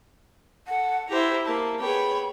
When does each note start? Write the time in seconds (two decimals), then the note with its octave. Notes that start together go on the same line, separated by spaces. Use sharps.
0.68 A4 F#5
1.09 E4 G4 C5 E5 A#5
1.46 A#3 A#4 A5
1.81 B3 G#4 C#5 G5 B5